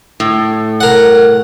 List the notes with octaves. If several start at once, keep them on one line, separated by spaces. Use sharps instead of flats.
A2
A#4 F#5